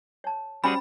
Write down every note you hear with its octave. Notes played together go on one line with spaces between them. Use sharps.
C#5 A5
G3 C#4 F#4 G#4 C5 G5 G#5 B5